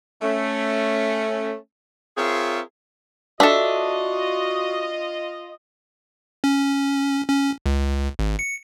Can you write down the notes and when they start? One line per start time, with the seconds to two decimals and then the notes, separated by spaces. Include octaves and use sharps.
0.22 A3 C#4
2.17 C4 F4 G#4 A#4 C#5 E5
3.40 D4 F4 F#4 A4 D#5 E5
6.44 C#4
7.29 C#4
7.66 C#2
8.19 G#1
8.39 C#7